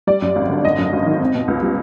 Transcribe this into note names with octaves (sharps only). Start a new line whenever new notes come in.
G3 D5
F#2
G#1
D3
G#1 D#5
F#2
G#1
D#3
C4
B2
C#2
G3